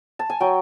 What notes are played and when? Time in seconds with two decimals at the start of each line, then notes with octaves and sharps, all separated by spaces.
0.19 A5
0.30 G#5
0.40 F#3 G5